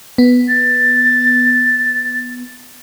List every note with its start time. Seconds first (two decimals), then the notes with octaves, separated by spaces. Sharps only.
0.18 B3
0.49 A6